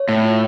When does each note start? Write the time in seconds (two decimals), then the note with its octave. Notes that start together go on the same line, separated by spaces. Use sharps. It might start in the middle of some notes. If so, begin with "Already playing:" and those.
Already playing: C#5
0.08 A2 E5
0.25 F4